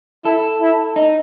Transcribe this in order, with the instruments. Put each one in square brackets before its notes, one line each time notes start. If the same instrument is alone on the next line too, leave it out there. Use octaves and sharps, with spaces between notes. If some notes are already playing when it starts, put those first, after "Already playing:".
[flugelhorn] E4 [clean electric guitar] A4
[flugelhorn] E4
[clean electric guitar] D#4